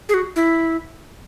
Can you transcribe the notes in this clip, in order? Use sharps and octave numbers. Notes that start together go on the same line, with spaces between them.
G#4
F#4
E4